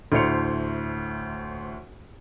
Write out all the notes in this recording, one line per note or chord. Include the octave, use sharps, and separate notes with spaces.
D2 A2 A3 C5 C#7 F7